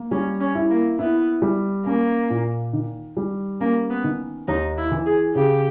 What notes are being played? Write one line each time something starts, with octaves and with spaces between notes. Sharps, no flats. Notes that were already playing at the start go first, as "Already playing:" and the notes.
Already playing: A#3
G3 C#4
C#4
E4
A#3
B3 E4
G3
A#3 C#4
A#2
D#3
G3
A#3 C#4
B3
D#3
D#2 D#4
E4
E3
G#4
C#3 G4